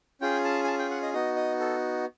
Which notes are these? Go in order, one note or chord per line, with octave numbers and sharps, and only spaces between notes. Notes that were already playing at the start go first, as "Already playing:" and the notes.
C#4 F4 G#4 G5
A5
G#5
A5
G5
F#5
D#5
B3 D#4 F#4 D#5
D#5
A4